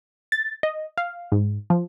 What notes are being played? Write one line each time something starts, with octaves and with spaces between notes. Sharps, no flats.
A6
D#5
F5
G#2
F3